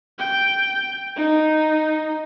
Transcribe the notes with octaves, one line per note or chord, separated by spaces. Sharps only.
G5
D#4